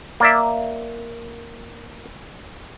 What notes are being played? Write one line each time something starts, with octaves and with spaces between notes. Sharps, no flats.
A#3 D5 E5